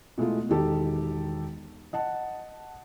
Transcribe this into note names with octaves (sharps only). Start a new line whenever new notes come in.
B2 G#3 A3 E4 F4
E1 D#3 G4 A4
D#5 F#5 A5